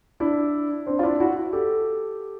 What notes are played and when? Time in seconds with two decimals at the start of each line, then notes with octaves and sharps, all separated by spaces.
0.20 D4 E4
0.86 C4 D4
0.99 F4
1.03 D4 E4
1.20 E4 F#4
1.53 G4 A4